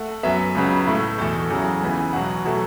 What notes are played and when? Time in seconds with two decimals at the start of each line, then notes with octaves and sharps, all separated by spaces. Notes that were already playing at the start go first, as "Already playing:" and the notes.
Already playing: A3 F#5
0.23 F#2 F#3 B3 E5
0.55 C#2 C#3 F#3 B3
0.87 A2 A3
1.18 E2 B2 A3 A4
1.50 E2 C#3 F#3
1.82 C#2 C#3 E3 B3
2.13 E2 B2 F#3 F#5
2.45 B2 F#3 A3